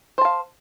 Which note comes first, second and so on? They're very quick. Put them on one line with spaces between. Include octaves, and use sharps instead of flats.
C5 A5 F5